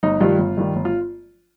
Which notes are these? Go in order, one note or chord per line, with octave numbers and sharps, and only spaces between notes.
G1 D#4
G2 D#3 G3 F4
G1
G2 D#3 G3
G1
F4